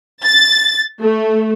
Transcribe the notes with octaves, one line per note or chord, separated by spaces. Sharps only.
A6
A3